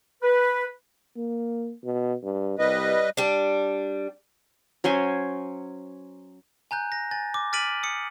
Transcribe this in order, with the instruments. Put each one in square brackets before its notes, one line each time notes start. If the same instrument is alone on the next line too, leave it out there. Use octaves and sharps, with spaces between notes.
[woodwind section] B4
[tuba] A#3
B2
G2
[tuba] C2 [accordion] G3 B4 D#5
[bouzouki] G3 D4
[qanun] F#3 C#4 C5 G#5
[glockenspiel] G#5 A#5 F#6 G6
A#6
G#5 A6
D6
F6 A6 B6 D7 D#7 F#7
D#6 C#7